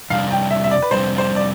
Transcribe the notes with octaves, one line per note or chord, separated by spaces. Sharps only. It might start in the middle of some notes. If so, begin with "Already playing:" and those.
F2 C3 G3 D4 F5
G5
E5
E5
D5
B4
F2 C3 G3 D4 C5
C5
D5